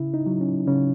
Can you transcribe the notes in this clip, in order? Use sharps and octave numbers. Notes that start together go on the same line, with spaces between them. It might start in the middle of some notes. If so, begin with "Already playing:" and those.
Already playing: C#3 E4
D#4
F#3
C#4
C#3 C#4